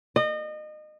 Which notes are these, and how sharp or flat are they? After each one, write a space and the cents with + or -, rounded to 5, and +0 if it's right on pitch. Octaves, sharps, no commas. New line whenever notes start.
D#5 -30